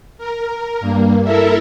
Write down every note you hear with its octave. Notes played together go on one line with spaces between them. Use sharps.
A#4
G2 A#3
E4 A4 A#4 E5